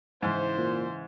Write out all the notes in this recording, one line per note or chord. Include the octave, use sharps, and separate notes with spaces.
G#2 C#3 E3 E4 C5
A#2